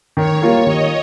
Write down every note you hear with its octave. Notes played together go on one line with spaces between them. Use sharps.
D#3 C#5
G3 A#3 F4 A#4
D#3 D#5